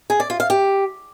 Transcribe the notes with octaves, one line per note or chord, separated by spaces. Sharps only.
G#4
D5
F4
F5
G4